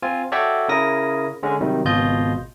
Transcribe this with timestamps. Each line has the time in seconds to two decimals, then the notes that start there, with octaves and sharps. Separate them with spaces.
0.02 C4 F4 G#5
0.32 F#4 A4 C#5 D5 E5 G5
0.68 C#3 E4 A#4 D#6 A#6
1.43 D3 G#3 C#4
1.61 C3 D#3 F#3 G3
1.85 G#1 C#2 B2 F4 D#5 G6